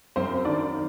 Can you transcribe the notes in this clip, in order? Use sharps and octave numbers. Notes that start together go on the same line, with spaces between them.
F#2 C4 C5
D#3 D4 D5